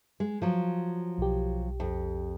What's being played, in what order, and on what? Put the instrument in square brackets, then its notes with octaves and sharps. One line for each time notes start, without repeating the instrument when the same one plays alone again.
[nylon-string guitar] G#3
F3 F#3
[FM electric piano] B1 G4
[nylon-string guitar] F2